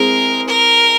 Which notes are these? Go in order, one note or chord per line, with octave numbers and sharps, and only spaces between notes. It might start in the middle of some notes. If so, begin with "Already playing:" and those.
Already playing: G#3 C4 E4 G#4 A#4
A#4